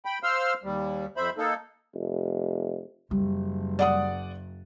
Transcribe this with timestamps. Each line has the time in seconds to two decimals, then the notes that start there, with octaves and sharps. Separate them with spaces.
0.05 G5 B5
0.23 C5 F5 C6 E6 F6
0.64 D#2 G3
1.17 F2 C5 E5 B5
1.38 A#3 D#4 A4
1.94 F1
3.11 F#1 G3
3.79 D5 F#5 D#6